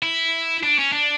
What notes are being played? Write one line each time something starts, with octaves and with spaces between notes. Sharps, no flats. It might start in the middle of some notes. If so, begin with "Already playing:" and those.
E4
D4
C#4
D4